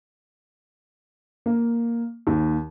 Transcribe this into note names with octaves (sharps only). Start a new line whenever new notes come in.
A#3
D#2